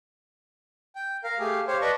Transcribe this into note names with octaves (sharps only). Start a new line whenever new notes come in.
G5
A#4 F5
A3 G4 G#4 F5
G4 C5 C#5 F5
B4 D5 D#5 A5 C#6